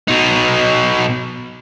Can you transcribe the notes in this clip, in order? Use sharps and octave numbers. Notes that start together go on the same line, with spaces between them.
B2 D#4